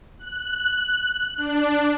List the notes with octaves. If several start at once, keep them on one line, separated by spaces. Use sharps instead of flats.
F#6
D4